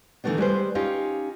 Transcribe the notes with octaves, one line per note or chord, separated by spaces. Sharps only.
D#3 E3 G#3 A3 B3 D4
G3 G#3 B4 C5
C#4 D#4 F4 G4